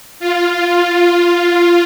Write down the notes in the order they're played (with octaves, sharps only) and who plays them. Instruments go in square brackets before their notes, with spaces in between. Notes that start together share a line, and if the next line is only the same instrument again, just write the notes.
[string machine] F4